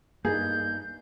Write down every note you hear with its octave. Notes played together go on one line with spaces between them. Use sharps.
G2 A#3 D#4 G#4 G6